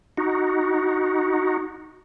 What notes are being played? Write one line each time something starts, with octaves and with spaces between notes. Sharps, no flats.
D#4 F#4